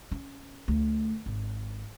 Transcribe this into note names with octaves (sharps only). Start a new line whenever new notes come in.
C#4
D2
G#1